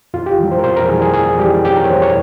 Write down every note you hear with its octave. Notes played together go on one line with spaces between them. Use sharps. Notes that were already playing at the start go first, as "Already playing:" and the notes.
F2 F4
G4
E3 G3
C5
A#4
F2 C5
A#4
E3 G3 G#4
G#4
F2 G#4
E3 G3 G4
F2 G4
A#4
C#5
E3 G3 C5
C#5